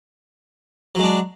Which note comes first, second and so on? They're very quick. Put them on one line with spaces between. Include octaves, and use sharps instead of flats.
F#3 G#3 D4